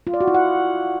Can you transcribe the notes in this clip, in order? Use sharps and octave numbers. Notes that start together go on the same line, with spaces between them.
F4
D5
F#4
E4
F#5